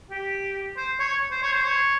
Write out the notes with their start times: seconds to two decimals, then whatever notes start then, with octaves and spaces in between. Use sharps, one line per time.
0.10 G4
0.77 C5
0.99 C#5
1.31 C5
1.43 C#5
1.54 C5
1.65 C#5